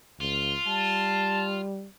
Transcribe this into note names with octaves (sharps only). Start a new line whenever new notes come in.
C#2 F4
G3 A5